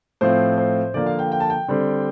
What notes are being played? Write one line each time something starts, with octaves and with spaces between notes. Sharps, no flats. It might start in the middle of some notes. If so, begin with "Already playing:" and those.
A2 F3 C4 C5
C5
D3 F3 A#3 D5
F5
G5
G5
A5
G5
D3 G3 C4